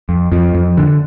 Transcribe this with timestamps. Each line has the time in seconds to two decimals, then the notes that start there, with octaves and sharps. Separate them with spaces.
0.09 F2
0.32 F2 F3
0.55 F2
0.77 D3